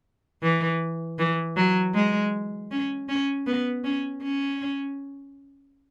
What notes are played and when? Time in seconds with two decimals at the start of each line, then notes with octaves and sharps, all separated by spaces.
0.43 E3
1.19 E3
1.56 F#3
1.95 G#3
2.71 C#4
3.09 C#4
3.47 B3
3.84 C#4
4.23 C#4